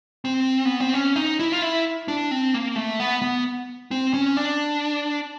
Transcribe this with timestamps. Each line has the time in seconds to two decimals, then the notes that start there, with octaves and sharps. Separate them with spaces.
0.25 C4
0.65 B3
0.80 C4
0.94 C#4
1.16 D#4
1.39 E4
1.52 F4
1.62 E4
2.08 D4
2.31 C4
2.54 A#3
2.76 A3
3.00 B3
3.22 B3
3.91 C4
4.14 C#4
4.37 D4